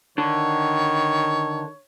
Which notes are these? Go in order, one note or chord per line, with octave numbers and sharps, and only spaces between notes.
D3 D#3 C#5